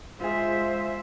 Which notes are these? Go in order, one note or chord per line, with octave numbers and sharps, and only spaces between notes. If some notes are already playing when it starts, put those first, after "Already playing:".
G#3 F4 G#4 C5 E5